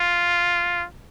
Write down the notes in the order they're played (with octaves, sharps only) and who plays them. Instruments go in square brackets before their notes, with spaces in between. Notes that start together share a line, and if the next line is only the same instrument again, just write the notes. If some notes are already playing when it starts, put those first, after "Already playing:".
Already playing: [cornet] F4